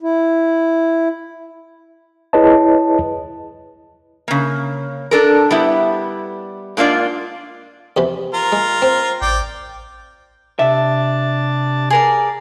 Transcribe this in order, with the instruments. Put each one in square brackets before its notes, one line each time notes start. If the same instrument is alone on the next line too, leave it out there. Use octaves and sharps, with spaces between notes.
[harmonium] E4
[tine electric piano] E4 G#4 B4 C#5 D#5 A5
[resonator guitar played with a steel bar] C#3 A#3
D4 A4 A#4
G3 B3 E4
G#2 A#3 D4 F4 D5
[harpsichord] E2 C3 E3
[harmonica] F4 A#4
[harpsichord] G#3
C4
[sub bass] A1 [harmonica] D5 G5
[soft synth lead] C3 [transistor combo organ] D4 A5 [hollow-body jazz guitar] E5
[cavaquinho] G#4 A#4 D5